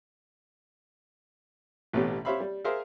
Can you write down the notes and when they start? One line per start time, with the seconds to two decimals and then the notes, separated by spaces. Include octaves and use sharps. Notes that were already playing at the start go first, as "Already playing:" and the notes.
1.93 A1 B2 A3 B3 C#4 G4
2.25 G4 C5 C#5 E5 F5 B5
2.40 G3
2.65 G#4 A#4 C5 E5 F5